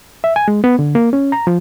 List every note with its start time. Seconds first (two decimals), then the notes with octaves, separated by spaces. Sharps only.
0.24 E5
0.36 G#5
0.48 G#3
0.64 B3
0.79 D3
0.95 A#3
1.13 C#4
1.32 A#5
1.47 F3